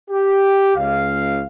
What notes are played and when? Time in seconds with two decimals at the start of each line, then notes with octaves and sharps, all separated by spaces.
0.10 G4
0.76 C#2 F5